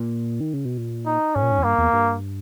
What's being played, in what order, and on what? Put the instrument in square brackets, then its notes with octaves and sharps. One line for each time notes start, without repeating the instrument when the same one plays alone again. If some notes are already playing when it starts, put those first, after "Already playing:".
Already playing: [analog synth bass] A#2
D#3
C#3
B2
A#2
[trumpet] D#4
[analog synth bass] G#2 [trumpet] C#4
[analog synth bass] A#2
G#2
E2
[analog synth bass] G2 [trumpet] A#3
[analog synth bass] E2
G2